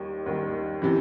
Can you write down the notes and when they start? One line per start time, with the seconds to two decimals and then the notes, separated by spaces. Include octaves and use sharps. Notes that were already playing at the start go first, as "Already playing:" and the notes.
Already playing: D#2 D#3 G3
0.26 D#2 D#3 G3
0.82 C3 E3